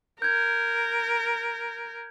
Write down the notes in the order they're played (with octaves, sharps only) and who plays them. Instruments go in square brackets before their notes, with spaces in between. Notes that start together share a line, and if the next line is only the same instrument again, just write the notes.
[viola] A#4 [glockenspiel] G6 G#6